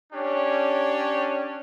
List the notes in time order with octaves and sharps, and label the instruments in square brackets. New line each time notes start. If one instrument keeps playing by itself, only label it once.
[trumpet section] C#4 D4 G4 C#5